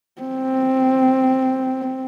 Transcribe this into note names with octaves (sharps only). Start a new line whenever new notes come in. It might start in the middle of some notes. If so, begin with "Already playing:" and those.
C4